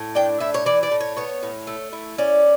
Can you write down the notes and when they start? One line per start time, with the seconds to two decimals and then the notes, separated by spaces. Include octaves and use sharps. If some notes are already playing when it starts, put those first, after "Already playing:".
Already playing: A2
0.15 D4 G5
0.40 A2 E5
0.54 C#5
0.66 E3 D5
0.83 D5
0.91 A2
1.01 C#5
1.17 B3 C#5
1.43 A2
1.67 A3
1.92 E4
2.18 C#4 D5